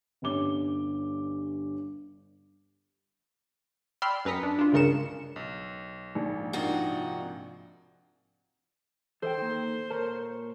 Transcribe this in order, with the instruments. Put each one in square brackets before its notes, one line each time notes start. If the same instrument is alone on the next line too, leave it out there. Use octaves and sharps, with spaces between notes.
[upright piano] G1 G2 C#4 D6 G7
[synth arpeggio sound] D5 G5 B5 C6 E6 F6
F#2 B4 A#5 D#6 B6 C#7
D4
D4 F4
C#2 G2 C#3 A#4 C#7 E7
[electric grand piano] B1
[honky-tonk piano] A#1 [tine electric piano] G#2
[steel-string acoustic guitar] C3 F4 F#4 [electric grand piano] D4 D#4 A#4
[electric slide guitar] E3 D#5 G5 [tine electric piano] A4 [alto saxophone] C5
[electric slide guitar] D#3 A#3
[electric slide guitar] A#2 C#5 A5 [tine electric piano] A#4